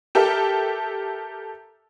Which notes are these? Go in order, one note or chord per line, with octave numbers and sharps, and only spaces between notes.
G4 A4 A#4 E5